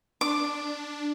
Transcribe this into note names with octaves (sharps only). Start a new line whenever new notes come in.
D4 D6